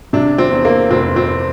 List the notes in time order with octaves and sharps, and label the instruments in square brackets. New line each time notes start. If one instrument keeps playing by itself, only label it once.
[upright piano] C3 D4
C4
E2
A#3
F1 C4
C4